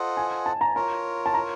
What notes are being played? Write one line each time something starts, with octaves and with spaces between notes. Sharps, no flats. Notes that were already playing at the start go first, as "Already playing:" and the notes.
Already playing: F4 A4 C5 D#5 F#5
G#5
A5
A#5
F4 A#4 C#5 A#5
A5
A#5